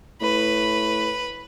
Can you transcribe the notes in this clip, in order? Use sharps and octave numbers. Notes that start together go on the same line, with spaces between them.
A2 B4